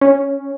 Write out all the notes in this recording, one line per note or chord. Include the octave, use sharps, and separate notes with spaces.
C#4